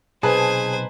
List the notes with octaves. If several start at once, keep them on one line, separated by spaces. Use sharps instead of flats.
B1 C3 D#4 G#4 B4 C5 G#5 A5